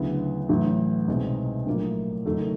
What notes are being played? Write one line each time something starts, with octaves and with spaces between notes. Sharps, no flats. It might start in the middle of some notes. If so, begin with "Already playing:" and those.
Already playing: D2 C#3 F#3 B3 E4
A1 A2 F#3
C2 B2 G#3 C4 D#4
A#1 A2 F#3 A#3
F#1 F#2 D#3 F#3 A3